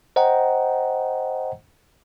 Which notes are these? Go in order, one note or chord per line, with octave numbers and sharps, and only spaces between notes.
C5 D#5 F#5 G5 A#5